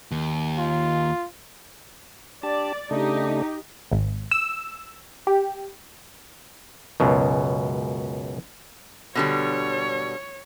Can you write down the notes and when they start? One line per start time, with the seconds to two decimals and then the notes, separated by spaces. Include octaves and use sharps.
0.11 D#2
0.58 F4
2.43 D4 G4 D5 A5
2.91 C#3 A3 D4 D#4 G4
3.92 G#1
4.31 E6
5.27 G4
7.00 C#2 F#2 B2
9.15 B2 D3 G3 C#5